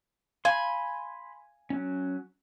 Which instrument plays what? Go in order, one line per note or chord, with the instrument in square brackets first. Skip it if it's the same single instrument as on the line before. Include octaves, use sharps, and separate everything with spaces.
[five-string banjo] F5 [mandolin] G#5 [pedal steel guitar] B5 C6
[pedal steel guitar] F#3 C#4